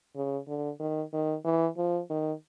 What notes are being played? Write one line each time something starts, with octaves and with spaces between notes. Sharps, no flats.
C#3
D3
D#3
D#3
E3
F3
D#3